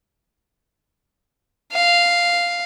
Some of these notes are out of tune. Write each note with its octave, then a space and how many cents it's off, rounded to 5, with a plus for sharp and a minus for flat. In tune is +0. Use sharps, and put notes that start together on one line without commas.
F5 -5